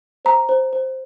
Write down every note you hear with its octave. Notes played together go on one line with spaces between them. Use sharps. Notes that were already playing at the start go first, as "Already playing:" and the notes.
C5 A#5
C5
C5